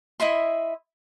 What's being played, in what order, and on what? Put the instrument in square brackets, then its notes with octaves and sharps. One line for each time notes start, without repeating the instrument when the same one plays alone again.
[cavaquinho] E4 D#5 E5 C6